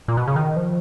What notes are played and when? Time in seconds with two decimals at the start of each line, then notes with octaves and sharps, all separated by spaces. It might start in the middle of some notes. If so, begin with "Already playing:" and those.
0.08 A#2
0.17 B2
0.28 C#3
0.36 D#3
0.56 F3